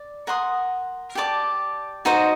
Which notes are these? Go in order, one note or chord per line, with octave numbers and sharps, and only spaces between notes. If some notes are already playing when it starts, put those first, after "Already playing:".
Already playing: D5
A#4 F#5 C6 D#6
G4 D5 A5 D6
D#4 F#4 C5 D#5